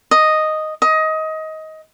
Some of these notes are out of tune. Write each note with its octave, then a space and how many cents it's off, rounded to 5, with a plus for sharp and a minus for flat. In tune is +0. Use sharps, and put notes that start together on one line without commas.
D#5 +0
D#5 +20